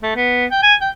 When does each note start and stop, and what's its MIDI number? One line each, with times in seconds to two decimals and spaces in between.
0.03 0.12 57
0.16 0.45 59
0.51 0.60 79
0.63 0.74 80
0.81 0.89 79